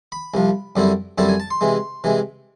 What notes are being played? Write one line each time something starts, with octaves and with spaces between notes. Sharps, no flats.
B5
C2 C3 F3
F#2 D3 G3 C4 E4
F#2 D3 G3 C4 E4 A5
G#5
A5
C6
C3 E3 G#3
C3 E3 G#3